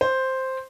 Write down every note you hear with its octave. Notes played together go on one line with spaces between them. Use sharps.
C5